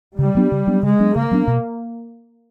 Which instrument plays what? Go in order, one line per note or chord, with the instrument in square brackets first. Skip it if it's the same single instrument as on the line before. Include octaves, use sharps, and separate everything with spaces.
[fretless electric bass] C#3 [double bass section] G3
[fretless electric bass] F#3 B3 D4
C#3
F#3 B3 D4
[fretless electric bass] C#3 [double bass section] G#3
[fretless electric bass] F#3 B3 D4
[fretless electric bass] C#3 [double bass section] A#3
[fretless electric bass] F#3 B3 D4
B2